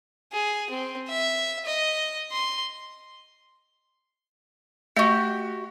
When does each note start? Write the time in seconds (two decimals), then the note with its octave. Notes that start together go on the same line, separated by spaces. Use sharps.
0.32 G#4
0.70 C4
1.09 E5
1.66 D#5
2.32 C6
4.97 A3 F#4 G4 D#5